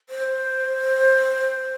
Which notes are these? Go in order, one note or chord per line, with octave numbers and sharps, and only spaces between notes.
C5